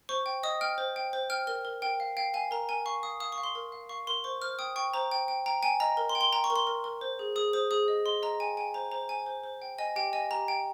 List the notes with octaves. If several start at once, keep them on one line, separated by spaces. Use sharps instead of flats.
C5 C#6
G5
D#5 D#6
G5 F6
C5
G5
C5
G5 F6
A#4 F6
A#4
A#4 G5
F5
F5 G5
F5 G#5
A#4 A#5
A#4 G#5
F5 C#6
F5 D#6
F5 D#6
C#6
F5
C6
A#4
F5
F5 C#6
A#4 C6
C5 C#6
C5 F6
G5 D#6
G5 C#6
C5 A#5
G5
G5
G5 A#5
G5 G#5
D#5 A#5
A#4
C6
G5
C6
G5 A#5
C#6
A#4
C6
A#4
A#4
C5
G#4
G#4 D#6
C5 D#6
G#4 D#6
D#5
D#5 C6
D#5 A#5
G5 G#5
G5 G#5
C5 A#5
C5 A#5
C5 G#5
C5
C5
G5
D#5 G#5
G4 G5
D#5 G#5
G4 A#5
G5